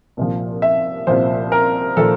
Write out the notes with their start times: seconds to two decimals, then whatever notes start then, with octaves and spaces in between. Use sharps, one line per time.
0.17 C2 A#2 F3
0.62 E5
1.07 C2 A#2 F3 C5
1.52 A#4
1.97 A#2 F3 A4